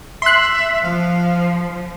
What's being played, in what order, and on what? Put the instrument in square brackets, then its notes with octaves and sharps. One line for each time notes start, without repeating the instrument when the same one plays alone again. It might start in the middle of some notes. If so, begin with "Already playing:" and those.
[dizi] E5 [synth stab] C6 F#6
[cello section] F3 [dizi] F5